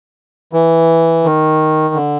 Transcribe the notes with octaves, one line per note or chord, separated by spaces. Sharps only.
E3
D#3
D3